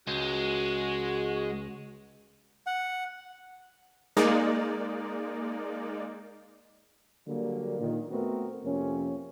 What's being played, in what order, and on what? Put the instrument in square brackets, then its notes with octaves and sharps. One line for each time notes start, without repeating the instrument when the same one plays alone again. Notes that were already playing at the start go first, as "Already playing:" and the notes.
[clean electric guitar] C#2 [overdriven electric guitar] G#3 [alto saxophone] F#4
[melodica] F#5
[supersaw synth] G#3 A#3 D#4 D5
[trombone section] D3 F#3 G3 A#3
A#2 D#3
A3 B3 C4 F#4 A#4
F2 C3 A#3 C#4